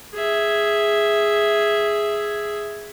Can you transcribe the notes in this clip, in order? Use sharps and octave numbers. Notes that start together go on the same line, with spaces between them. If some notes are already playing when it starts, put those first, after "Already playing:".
G#4 E5